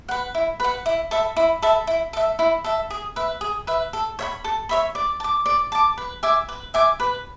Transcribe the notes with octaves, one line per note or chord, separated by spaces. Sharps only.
B4 F#5
E4
B4 F#5
E4
A4 E5 B5
E4
A4 E5 B5
E4
A4 E5
E4
A4 E5
G#4
B4 E5
G#4
B4 E5
A4
C#5 E5 B5
A4
C#5 E5 B5
D5
A5
D6
D5
A5 D6
B4
E5 G#5 D6
B4
E5 G#5 D6
B4